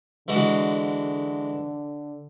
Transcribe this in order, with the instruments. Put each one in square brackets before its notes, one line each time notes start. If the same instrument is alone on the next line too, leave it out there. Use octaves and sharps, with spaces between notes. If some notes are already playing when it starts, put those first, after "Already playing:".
[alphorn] D3 [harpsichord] E3 G#3 F#4